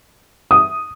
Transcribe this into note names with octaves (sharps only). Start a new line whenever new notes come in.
D#6